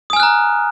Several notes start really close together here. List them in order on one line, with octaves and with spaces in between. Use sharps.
D#6 G#5 F6 F#6 A#5